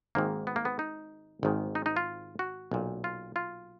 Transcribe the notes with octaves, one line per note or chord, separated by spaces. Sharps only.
G#1 G#2 D#3 A#3
B3
A#3
B3
D#4
G#1 G#2 D#3
D#4
D#4
F4
F#4
B1 A#2
F4
F4